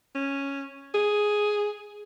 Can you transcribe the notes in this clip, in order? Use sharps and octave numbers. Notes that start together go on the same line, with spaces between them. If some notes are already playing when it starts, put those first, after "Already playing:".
C#4
G#4